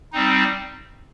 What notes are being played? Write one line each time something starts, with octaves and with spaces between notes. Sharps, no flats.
G3 C4 D#4